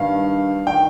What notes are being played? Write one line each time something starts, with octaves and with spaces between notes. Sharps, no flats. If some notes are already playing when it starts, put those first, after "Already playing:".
Already playing: G2 D#3 F5
D#3 G5